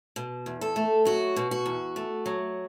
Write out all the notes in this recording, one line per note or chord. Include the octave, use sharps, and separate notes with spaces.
B2
E2
A4
A3
F#3 F#4
B2
F#4
E2
A3
F#3